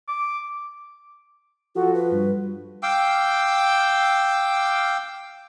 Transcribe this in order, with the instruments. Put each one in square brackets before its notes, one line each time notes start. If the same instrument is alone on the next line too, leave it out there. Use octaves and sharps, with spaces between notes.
[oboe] D6
[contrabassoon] F3 [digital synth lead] F#4 [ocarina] A4
[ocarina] B4
[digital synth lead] G2
[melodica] F5 G5 D6 E6